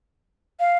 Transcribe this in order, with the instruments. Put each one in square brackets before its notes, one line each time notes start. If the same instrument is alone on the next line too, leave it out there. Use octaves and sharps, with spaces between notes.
[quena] F5